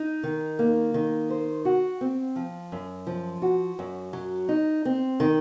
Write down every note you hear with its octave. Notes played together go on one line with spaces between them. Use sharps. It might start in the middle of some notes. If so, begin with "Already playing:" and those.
Already playing: D#4
D#3
A#3
D#3
C5
F#4
C4
F3
F#2
F3
F#4
F#2
F#3
D#4
C4
D#3